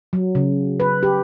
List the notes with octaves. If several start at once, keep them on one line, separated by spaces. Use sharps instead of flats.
F#3
C#3
B4
G4